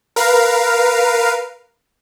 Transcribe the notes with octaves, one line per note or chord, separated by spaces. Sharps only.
A#4 B4 F5